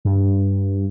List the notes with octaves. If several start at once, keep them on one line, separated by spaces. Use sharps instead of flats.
G2